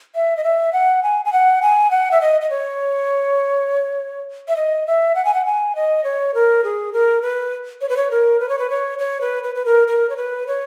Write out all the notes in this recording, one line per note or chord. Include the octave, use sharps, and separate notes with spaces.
E5
D#5
E5
F#5
G#5
G#5
F#5
G#5
F#5
E5
D#5
D#5
C#5
E5
D#5
E5
F#5
G#5
F#5
G#5
D#5
C#5
A#4
G#4
A#4
B4
C#5
B4
C#5
A#4
B4
C#5
B4
C#5
C#5
B4
B4
B4
A#4
A#4
C#5
B4
C#5